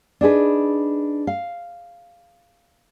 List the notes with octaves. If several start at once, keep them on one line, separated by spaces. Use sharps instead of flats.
D4 D#4 G#4 B4
F5